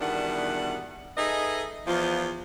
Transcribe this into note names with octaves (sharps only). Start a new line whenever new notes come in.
E2 B2 D#3 G3 D4 F#5
D#4 G#4 A4 B4 D#5 E5
E2 F3 F4